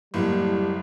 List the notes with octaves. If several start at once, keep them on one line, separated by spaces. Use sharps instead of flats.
F#1 A2 G3 A#3